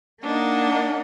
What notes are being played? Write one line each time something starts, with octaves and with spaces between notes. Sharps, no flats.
A#3 D4 D#4 F#5